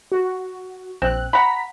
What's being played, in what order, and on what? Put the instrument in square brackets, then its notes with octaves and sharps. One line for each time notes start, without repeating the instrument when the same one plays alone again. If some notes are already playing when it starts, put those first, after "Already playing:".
[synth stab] F#4
[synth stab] A#1 F#6 [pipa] C4
[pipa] F#5 B5 [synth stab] A#5 B6